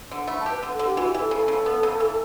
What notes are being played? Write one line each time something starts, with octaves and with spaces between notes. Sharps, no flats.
D3
A3 B5
A5
G4 B4
D3
A4
D3
G4
E3 F#4
G4
E3
A4
C#3 A4
C#3
B3
C#3
E3